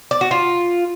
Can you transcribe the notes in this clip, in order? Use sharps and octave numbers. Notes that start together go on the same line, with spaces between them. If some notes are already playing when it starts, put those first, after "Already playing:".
D5
F#4
F4